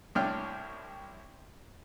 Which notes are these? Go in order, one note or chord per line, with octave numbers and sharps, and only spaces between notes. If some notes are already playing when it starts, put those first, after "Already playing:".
C2 A2 D4 C#5 G5 F6